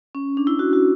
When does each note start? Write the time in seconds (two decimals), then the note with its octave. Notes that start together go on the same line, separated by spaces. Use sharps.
0.15 C#4
0.37 D4
0.47 E4
0.59 F#4
0.73 F#4